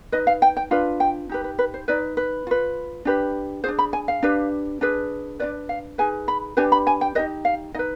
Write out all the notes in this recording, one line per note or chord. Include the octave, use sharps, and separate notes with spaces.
D#4 B4 D#5
F5
G5
G5
D4 F4 B4
G5
D#4 G4 B4
B4
B4
C5
D#4 B4 D5
B4
F4 B4
D4 G4 B4
D4 F4 G#4 C5
B5
G#5
F5
D4 G4 B4
D4 G#4 B4
D4 F4 B4 D5
F5
D#4 G#4 B4 G#5
B5
D4 G4 B4 G#5
B5
G#5
G5
D#4 G4 B4 D#5
F5
D#4 B4 D#5